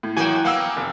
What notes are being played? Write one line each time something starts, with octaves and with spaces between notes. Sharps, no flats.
A2
F#2 E3 A#3 F#4 G5 G#5
A#3 B3 F5 F#5 E6
F1